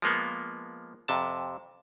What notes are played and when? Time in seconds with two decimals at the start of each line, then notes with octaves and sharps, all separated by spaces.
0.02 F3 G#3 A#3 B3
1.08 F2 C3 A5